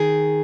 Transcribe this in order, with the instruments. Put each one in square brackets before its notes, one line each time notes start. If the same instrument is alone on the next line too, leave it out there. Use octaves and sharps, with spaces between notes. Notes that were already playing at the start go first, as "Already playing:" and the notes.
Already playing: [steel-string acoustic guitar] D#3 G#4